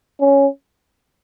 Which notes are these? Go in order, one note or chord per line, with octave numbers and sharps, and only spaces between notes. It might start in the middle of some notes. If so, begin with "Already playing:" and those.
C#4